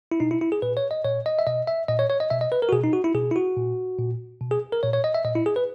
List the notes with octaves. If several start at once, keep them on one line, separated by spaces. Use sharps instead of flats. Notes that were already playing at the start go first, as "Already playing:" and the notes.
E4
B2 D#4
E4
E4
G#4
A#2 B4
C#5
D#5
A#2 C#5
D#5
E5
B2 D#5
E5
A#2 D#5
C#5
C#5
D#5
B2 E5
D#5
B4
A#4
F#4
B2 G#4
D#4
F#4
E4
B2 G#4
E4
F#4
A#2
A#2
B2
G#4
A#4
A#2 C#5
C#5
D#5
E5
A#2 D#5
E4
G#4
B4